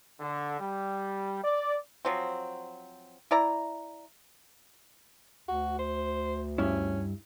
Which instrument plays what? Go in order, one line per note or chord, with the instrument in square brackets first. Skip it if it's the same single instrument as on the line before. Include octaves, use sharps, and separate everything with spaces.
[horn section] D3
G3
D5
[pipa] F3 F#3 C4
E4 D5 A#5
[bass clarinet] D2 [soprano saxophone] F#4
[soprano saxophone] C5
[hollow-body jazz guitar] G2 E4 [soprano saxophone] C#4